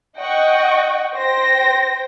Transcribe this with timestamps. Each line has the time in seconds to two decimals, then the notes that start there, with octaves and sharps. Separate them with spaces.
0.19 D#5 F#5 G5 C#6
1.14 C5 G5 A#6